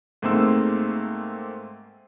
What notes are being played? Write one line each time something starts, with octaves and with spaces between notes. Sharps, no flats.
G#2 A3 A#3 C4 C6 E6